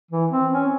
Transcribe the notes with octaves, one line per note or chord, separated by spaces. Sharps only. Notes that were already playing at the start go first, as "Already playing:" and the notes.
E3
C4
C#4